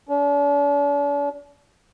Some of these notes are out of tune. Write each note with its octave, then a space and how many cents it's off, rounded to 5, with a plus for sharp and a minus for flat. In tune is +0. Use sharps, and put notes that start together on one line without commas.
D4 -45